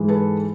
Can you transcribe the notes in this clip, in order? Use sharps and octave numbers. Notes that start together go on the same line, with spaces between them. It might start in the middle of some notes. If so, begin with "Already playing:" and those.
Already playing: G#2 E3 G#3
A4 B4